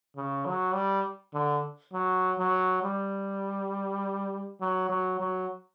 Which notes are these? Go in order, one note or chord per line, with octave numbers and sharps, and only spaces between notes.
C#3
F#3
G3
D3
F#3
F#3
G3
F#3
F#3
F#3